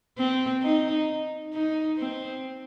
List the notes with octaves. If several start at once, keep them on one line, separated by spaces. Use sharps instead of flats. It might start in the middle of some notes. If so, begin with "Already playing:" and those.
C4
D#4
D#4
C4